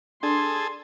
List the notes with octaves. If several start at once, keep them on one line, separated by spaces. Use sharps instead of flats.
D4 G#4 A4 C6